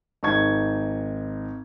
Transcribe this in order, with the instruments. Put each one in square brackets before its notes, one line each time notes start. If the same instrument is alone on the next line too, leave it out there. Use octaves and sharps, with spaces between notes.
[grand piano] G#1 D#4 C#6 G#6